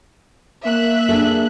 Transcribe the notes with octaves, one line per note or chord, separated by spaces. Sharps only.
A#3 E5 F#6
D4 G#4 A4